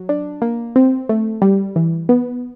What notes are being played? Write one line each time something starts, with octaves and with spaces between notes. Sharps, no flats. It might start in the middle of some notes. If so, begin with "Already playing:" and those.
Already playing: F#3
D4
A#3
C4
A3
G3
E3
B3